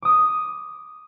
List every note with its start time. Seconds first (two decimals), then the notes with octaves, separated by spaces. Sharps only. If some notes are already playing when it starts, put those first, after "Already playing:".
0.02 D6 D#6